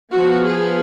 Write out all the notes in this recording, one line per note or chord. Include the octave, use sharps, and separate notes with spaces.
F3 B3 F#4
G#4